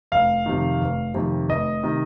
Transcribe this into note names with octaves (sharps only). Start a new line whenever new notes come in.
F1 F5
F2 C3 D#3
F1
F2 C3 D#3
F1 D#5
C3 D#3